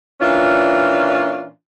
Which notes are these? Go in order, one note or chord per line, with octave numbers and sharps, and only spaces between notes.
A#2 E3 C#4 D4 F4